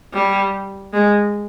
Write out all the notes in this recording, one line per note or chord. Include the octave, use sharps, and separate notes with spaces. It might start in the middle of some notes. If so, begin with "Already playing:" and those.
G3
G#3